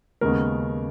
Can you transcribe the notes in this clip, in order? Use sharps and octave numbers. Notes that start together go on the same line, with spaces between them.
D#2 C#3 G#3 B3 A#4